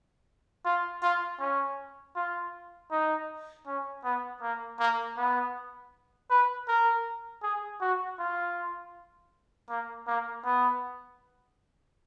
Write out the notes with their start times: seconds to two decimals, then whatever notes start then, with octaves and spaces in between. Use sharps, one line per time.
0.65 F4
1.03 F4
1.40 C#4
2.16 F4
2.91 D#4
3.67 C#4
4.04 B3
4.42 A#3
4.79 A#3
5.17 B3
6.30 B4
6.68 A#4
7.43 G#4
7.81 F#4
8.19 F4
9.69 A#3
10.07 A#3
10.45 B3